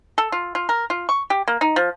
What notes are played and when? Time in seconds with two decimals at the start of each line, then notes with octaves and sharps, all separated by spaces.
0.18 A4
0.32 F4
0.55 F4
0.69 A#4
0.90 F4
1.09 C#6
1.30 G4
1.48 A#3
1.61 D#4
1.76 F3